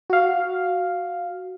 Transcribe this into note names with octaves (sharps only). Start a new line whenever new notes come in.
F#4 F5